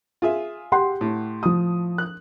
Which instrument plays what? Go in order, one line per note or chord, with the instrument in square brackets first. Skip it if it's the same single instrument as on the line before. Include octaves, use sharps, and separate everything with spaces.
[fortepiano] F4 G#4 E5
[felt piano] G4 F#5 C6
[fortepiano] A2
[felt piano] F3 D#6
[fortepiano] F#6